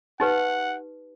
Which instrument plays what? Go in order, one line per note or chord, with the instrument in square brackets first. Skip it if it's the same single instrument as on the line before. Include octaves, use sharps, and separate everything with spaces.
[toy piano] D#4 G4 B4 [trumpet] F#5